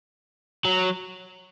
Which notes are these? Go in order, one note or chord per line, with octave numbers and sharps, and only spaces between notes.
F#3